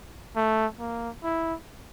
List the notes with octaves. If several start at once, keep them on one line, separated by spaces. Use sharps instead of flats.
A3
A#3
E4